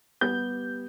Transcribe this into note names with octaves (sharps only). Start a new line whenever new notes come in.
G3 B3 G4 G6